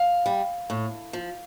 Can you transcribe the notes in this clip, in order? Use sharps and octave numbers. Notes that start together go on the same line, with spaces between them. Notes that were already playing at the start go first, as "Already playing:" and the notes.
Already playing: F5
G3
A2
F3